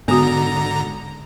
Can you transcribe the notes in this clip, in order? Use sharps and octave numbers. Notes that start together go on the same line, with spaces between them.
G#2 D3 B3 F#4 A#5